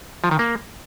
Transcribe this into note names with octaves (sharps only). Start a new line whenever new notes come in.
F3
D#3
A#3